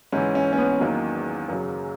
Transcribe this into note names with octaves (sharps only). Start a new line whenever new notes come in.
G#2 E3 C#4
C#4
C#4
B3
E2 D#3 F#3 A#3
F#2 C#3 F#3